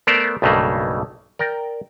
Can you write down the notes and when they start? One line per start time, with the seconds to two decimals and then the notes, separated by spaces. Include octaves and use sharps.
0.07 A3 B3 A#4 C5 D5
0.42 B1 G2 C#3 A3 A#3
1.39 A#4 D5 G5